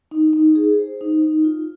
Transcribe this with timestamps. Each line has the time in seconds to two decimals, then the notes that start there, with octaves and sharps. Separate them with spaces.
0.11 D#4
0.33 D#4
0.55 G#4
0.79 C5
1.01 D#4
1.22 D#4
1.44 F4